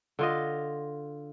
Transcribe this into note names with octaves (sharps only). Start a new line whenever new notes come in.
D3 F4 D#5